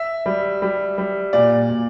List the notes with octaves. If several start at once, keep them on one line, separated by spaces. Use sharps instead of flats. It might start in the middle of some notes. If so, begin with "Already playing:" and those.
Already playing: E5
G3
G3
G3
A#2 D5
A#2